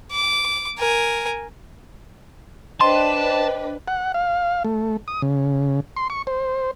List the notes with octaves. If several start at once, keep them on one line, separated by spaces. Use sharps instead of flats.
D6
A#4 G#5
D4 B4 C5 D#5 G5 A5 C6
F#5
F5
A3
D#6
C#3
C6
C#6
C5